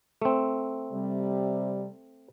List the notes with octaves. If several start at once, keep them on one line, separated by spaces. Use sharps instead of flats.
A3 C4
C3 G3